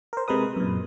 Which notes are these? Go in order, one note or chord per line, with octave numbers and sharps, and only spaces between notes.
A#4 C5
C3 G#3 A#4 B4 D#6
F#2 A#2